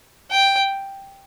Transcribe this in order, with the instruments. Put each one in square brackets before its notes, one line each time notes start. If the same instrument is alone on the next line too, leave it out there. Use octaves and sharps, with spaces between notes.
[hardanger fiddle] G5